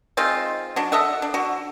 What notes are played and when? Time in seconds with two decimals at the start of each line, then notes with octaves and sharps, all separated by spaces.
0.17 G#3 C4 D#4 F4
0.76 F#3 D4
0.92 A4 D#5 E5 F#5
1.22 D4
1.34 D3 F#4